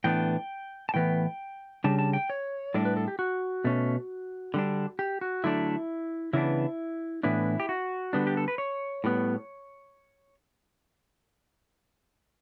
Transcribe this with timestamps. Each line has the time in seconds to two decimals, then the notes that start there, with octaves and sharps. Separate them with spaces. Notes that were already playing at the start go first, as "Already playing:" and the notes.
0.04 A2 E3 B3 D4 G5
0.89 A5
0.94 A2 E3 B3 G5
1.84 C#3 G3 D4 A5
1.99 A5
2.13 G5
2.30 C#5
2.74 A2 G3 D4 A4
2.85 B4
2.97 A4
3.08 G4
3.19 F#4
3.64 B2 A3 C#4
4.54 D3 G3 D4
4.99 G4
5.21 F#4
5.44 D3 F#3 A3 D4 E4
6.33 C#3 E3 B3 D4 E4
7.23 A2 E3 B3 D4 E4
7.60 G4
7.69 F#4
8.13 D3 G3 B3 D4
8.27 G4
8.37 A4
8.48 B4
8.58 C#5
9.04 A2 G3 B3